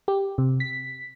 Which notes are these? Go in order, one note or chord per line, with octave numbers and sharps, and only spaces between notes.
G4
C3
B6